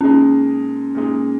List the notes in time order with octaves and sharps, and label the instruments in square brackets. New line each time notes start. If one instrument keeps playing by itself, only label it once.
[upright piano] A#2 G#3 D#4 [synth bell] C#4
[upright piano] A#2 G#3 D#4